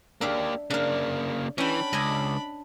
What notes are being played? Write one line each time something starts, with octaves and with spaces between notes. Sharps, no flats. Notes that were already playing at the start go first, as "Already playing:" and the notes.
A#3 D4 G4 E5 F5
C#3 A#3 D4 F5
E3 C#4 D4 G5 B5
C#2 D#5 G#5